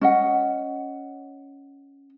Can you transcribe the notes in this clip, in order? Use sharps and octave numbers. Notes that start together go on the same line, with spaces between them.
C#4 D#5 F#5